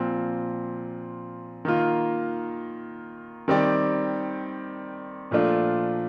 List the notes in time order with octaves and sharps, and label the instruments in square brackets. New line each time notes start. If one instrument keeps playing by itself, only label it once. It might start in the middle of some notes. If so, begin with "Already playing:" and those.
Already playing: [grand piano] A#2 F3 C4
D#3 A#3 F4
D#3 G3 C4 G4 D5
A#2 F3 A3 D4 F4